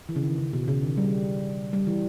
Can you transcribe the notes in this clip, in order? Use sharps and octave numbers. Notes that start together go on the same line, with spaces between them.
E3
C#3
D#3
C#3
B2
C#3
D#3
G3
G3
E3